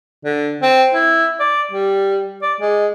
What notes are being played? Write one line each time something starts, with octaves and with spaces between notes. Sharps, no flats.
D3
C4
E4
D5
G3
D5
G#3